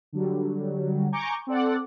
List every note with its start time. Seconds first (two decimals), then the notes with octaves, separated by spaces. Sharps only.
0.13 D3 F#3 G3
1.12 G#5 A#5 C#6 D6 G6
1.47 C4 A4 D5 F#5